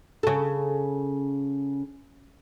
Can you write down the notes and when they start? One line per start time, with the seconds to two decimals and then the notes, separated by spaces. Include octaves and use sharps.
0.23 C#3 A4